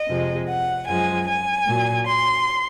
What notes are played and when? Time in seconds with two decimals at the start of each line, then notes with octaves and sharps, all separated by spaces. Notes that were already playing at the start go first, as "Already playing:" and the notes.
Already playing: D#5
0.08 F2 C3 F3 G#3
0.48 F#5
0.87 F#2 F3 G#3 G#5
1.28 G#5
1.66 A#2 F#3
2.06 C6